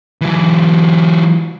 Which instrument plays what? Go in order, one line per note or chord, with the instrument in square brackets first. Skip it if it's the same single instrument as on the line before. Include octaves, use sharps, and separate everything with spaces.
[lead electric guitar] E3 F#3